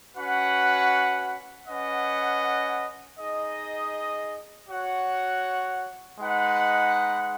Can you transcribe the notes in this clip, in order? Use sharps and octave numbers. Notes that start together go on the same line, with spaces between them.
C#4 F#4 B4 F#5
C#4 B4 D#5 F#5
D#4 G#4 D#5
F#4 C#5 F#5
G#3 D#4 B4 F#5